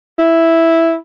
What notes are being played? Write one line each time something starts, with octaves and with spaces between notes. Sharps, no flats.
E4